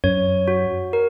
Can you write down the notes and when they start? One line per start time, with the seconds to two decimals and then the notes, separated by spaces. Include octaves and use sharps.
0.04 F#2 C#5
0.48 F#4
0.93 A#4